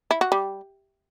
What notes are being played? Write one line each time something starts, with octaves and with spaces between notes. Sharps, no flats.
E4
F#4
G3